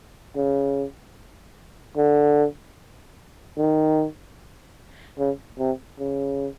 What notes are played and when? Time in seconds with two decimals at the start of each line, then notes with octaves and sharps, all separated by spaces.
0.36 C#3
1.97 D3
3.58 D#3
5.18 C#3
5.59 C3
5.99 C#3